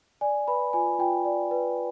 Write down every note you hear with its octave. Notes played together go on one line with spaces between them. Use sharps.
D5 G#5
B4 B5
F4 G#5
F4 G5
D5
B4